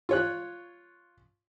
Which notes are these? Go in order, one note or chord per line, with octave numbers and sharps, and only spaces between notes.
F4 C#5 F#6